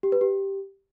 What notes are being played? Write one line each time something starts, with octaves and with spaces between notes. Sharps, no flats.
G4
B4
G4